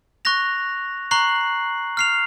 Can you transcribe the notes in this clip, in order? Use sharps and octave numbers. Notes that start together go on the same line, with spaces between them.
C#6 F#6 A#6 F7
A#5 C#6 F#6 C7 F#7
F6 C7 F7